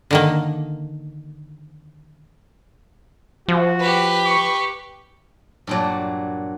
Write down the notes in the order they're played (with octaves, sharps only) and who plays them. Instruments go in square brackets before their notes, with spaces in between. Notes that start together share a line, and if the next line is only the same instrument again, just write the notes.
[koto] D3 D#3 A#3
[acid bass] F3 [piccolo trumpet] F#4
[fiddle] G4 B4
[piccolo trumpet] C#6
[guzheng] G2 A#2 F#3